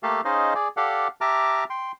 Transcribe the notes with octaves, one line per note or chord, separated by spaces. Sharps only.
A3 A#3 G4 A4 F5 A5
C#4 D#4 G#4 C5 D#5 F5
G#4 D5
G4 A4 D5 F5 F#5
G4 E5 A5 A#5 D6 F6
G5 C6